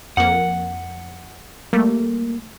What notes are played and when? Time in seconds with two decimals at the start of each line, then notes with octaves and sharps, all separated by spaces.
0.17 F2 A#3 F#5
1.73 G3 A3 A#3